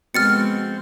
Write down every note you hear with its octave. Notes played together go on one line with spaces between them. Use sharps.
F2 B2 G#3 B3 C4 F6 A6 C#7